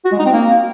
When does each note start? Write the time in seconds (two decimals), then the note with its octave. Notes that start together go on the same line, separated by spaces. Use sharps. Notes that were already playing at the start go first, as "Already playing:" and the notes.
0.05 F#4
0.12 G#3
0.19 D#4
0.26 C4
0.33 A#3